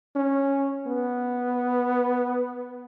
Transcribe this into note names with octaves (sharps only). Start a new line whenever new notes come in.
C#4
B3